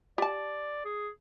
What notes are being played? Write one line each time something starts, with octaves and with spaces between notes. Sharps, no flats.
G4 D5 A5
G#4